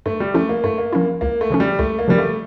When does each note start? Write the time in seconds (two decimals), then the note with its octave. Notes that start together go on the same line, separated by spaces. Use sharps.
0.06 G2 A3
0.20 G3
0.34 F3 A3 C#4 E4
0.49 A#3
0.64 G2 A3
0.78 A#3
0.93 F3 A#3 C#4 E4
1.21 C#2 A#3
1.41 A3
1.50 C#3 F3 C#4
1.60 G3
1.79 C#2 A3
1.99 A#3
2.08 C#3 F3 G3 C#4
2.18 A3